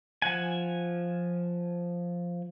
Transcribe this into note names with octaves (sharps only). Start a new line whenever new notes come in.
F3 F#5 G#5